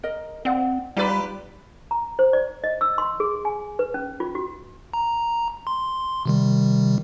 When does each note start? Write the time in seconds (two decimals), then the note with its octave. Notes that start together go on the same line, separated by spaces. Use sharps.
0.03 A#4 D#5
0.45 C4 D5 F5 F#5
0.97 G3 D#4 F4 G4 B4 D5
1.91 A#5
2.19 C5
2.33 D5
2.64 D#5
2.81 E6
2.98 C6
3.20 G#4
3.45 G#5
3.79 B4
3.94 C#4
4.20 F4
4.35 F#4
4.93 A#5
5.67 C6
6.26 C3 D#3 G3